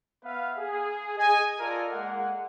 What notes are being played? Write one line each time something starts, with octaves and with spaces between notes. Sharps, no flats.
B3 B4 E5 F5
G#4
D#5 G#5
F4 A4 A#4 D5 D#5
G#3 A#3 F#5